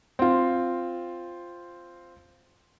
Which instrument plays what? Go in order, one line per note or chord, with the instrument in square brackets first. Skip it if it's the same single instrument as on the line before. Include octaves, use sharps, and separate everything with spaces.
[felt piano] C4 F4